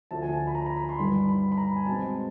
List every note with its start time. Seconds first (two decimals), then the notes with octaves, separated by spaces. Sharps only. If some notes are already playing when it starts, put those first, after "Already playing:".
0.11 D2 D3 F3 A5
0.22 G#5
0.33 A5
0.47 B5
0.55 A#5
0.66 A#5
0.76 B5
0.89 C6
0.99 G2 D#3 G3 B5
1.29 B5
1.52 B5
1.57 A#5
1.76 G#5
1.86 B2 G#3 C4 A5